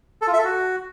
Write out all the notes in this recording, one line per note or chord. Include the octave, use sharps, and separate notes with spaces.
A4
F4
E5
A4
F#4